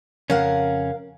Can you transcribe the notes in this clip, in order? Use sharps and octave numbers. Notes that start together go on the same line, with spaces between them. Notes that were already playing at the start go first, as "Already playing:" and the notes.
F2 C#3 C#4 A#4 F5 F#5